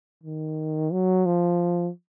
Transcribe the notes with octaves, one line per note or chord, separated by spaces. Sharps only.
D#3
F#3
F3